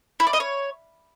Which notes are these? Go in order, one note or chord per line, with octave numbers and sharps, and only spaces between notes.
E4
D5
D#5
C#5